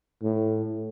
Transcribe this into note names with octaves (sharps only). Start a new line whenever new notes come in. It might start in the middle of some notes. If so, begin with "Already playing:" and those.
A2